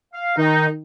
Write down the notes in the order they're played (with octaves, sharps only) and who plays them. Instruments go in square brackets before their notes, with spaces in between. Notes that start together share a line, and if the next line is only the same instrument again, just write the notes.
[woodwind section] F5
[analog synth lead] D#3 [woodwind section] D#4